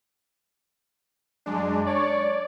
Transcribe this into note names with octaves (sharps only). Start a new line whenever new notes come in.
F#2 G#3 D4
C#5 D5